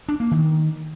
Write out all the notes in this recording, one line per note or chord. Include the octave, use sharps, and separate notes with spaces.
D4
A#3
D#3